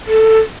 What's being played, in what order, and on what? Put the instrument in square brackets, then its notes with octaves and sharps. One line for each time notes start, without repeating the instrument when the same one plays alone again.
[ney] A4